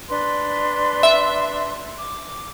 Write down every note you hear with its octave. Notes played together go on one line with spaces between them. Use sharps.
D4 B4 C6
E5
D6